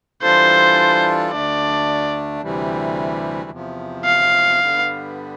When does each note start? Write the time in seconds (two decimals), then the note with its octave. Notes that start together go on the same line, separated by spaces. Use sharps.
0.22 E3 G3 D4 F4 A4 C5
1.32 D2 D3 A3 D4 D5
2.41 D2 C3 E3 G3
3.50 E2 C3 F3
4.05 F5
4.60 G2 D3 G3 B3